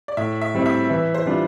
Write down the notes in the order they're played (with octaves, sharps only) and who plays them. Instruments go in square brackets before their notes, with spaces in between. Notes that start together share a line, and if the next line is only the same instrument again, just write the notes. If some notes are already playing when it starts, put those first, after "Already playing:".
[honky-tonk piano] D5
[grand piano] A2 [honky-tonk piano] E5
[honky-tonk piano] E5
[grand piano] G3 C4 E4
[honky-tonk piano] E5
[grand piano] E3
[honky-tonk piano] C5
[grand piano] G3 D4 F4